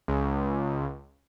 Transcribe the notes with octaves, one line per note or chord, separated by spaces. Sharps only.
C#2